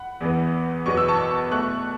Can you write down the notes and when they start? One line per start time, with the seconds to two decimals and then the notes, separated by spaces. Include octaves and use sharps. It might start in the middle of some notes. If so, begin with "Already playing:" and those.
Already playing: F#5 B5
0.21 E2 E3 B3
0.86 E2 B2 F#3 B3 C#6
0.97 E6
1.08 A5 C#6
1.51 B2 A3 C#6 F#6